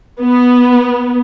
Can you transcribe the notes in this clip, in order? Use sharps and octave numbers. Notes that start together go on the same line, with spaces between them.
B3